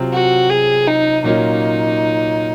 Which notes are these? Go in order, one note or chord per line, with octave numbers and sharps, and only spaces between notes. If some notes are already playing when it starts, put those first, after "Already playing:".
Already playing: C3 F#3 C4 F4
F#4
G#4
D#4
A#2 F#3 A#3 C#4 D#4 F4